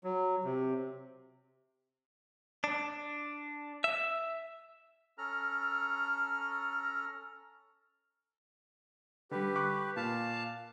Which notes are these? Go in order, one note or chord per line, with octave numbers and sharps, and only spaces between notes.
F#3
C3
D4
E5
C#4 A4 A#5 F6
D3 G3 G4 B4
C#6 D6 F#6
A#2 F5 A5